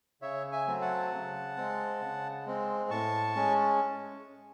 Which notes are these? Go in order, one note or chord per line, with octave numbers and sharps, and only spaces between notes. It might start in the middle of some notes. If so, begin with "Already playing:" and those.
C#3 C#5 E5
E5 G#5
F#3 A3 C4
F#5 A5
C#3
G#3 C4
C#3
G#3 C4
A2 A5 C#6
G#3 C#4